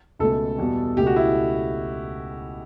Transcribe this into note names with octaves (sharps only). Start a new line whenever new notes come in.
C#2 B2 A3 A4
E2 B2 G3
C#2 B2 A3 G4
F#4
E4